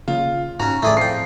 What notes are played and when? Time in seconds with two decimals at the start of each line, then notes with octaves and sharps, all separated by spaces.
0.08 C#3 A#3 F4
0.60 G#2 C#4 F#4 A#5
0.83 A2 E3 A3 G#4 D5
0.97 F2 G5 C7